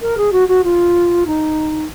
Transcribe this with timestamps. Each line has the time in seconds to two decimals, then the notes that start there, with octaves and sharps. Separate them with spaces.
0.01 A#4
0.17 G#4
0.32 F#4
0.48 F#4
0.63 F4
1.26 D#4